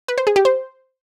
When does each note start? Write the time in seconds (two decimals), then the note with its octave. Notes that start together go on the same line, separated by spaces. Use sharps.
0.08 B4
0.18 C5
0.27 G#4
0.36 G4
0.45 C5